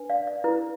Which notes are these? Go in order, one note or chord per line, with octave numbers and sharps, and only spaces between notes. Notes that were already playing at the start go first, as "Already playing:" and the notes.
Already playing: D4 B4
D5 F5
D5
E4 B4